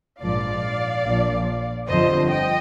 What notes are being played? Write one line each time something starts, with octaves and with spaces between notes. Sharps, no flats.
A#1 G#2 F3 D5 F5
A#1 A#2 F3
G1 F2 D3 F3 C5 D#5
D#5 G5